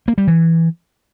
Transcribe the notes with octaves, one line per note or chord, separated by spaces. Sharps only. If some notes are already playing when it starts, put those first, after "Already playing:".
A#3
G3
E3